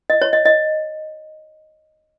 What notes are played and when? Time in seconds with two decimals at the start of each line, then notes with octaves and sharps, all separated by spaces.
0.10 D#5
0.22 C#5
0.33 D#5
0.45 D#5